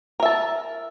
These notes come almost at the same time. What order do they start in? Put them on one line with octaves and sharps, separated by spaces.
A#4 E5 A5